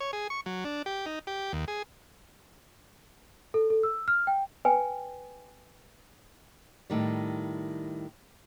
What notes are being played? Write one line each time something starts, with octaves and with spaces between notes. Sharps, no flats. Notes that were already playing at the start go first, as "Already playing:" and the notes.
C#5
G#4
C#6
F#3
D4
G4
D#4
G4
D#2
G#4
A4
A4
E6
F6
G5
B4 G5 G#5
A2 D#3 G3